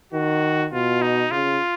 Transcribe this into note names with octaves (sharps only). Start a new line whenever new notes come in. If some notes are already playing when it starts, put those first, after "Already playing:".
D#3 F#4
B2 F4
D#4
C#3 F4